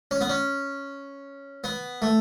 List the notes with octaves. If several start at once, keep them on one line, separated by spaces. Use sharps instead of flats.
C#4
B3
C#4
B3
A3